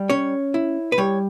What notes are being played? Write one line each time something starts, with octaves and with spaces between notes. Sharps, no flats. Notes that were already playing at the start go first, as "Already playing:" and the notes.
Already playing: G3
C#4 C#5
E4
B4
G3 C#5